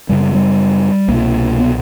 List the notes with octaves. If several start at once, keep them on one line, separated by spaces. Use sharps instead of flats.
F#2 C#3 G3
G3
C2 B2 A#3
B3